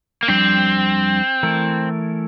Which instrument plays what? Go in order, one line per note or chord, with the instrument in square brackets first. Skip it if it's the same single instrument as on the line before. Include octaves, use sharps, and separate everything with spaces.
[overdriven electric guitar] A#3
[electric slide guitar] F2 C3 G3 D4 [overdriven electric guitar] C4
[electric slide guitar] E3 A3 E4 A#4